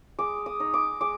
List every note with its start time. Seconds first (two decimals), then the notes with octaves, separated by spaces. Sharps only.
0.19 G#3 D6
0.46 D#6
0.60 D#4
0.74 D6
1.01 G#3 D6